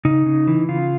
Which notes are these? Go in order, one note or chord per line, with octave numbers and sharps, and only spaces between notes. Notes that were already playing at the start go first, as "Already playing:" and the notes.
C#3 D#4
C#3
E3
C#3 F4